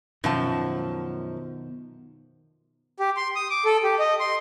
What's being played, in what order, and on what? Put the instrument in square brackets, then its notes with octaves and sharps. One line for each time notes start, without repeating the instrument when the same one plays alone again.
[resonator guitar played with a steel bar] F#2 F3 A5 [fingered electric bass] B2 D#3
[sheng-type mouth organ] G4
C6
D#6
D6
A4
G4
D#5
C6